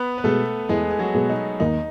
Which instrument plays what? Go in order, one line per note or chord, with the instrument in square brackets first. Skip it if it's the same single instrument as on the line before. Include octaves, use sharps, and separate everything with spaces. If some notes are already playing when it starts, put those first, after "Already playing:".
Already playing: [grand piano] B3 B4
B4
[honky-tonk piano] B2 G#3 [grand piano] A3 A4
[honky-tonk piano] E2 [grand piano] G#3 G#4
[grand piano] G#4
F#3 F#4
[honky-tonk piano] B2 G#3
[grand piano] D#4
[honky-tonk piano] D#2 [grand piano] D#4